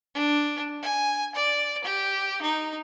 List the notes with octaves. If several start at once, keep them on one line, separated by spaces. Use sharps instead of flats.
D4
G#5
D5
G4
D#4